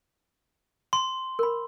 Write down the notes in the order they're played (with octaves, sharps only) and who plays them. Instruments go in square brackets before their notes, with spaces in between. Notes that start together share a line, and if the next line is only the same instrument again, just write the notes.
[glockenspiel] C6
[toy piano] A#4 B5